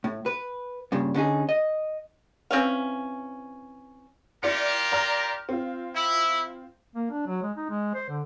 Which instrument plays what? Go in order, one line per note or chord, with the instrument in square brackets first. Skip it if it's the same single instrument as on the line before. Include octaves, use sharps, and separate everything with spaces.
[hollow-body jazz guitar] A2
B4
G2 A#2 C#3
D3 C#4 D#4 G#4
D#5
[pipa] E3 C4 C#4 F5
[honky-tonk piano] E4 D5 C#7 [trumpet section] F4 G4 A#4
[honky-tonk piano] D5 A#5 F6
C4 F4
[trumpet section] E4
[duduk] A#3
D4
F#3
G#3
D#4
G#3
C5
D3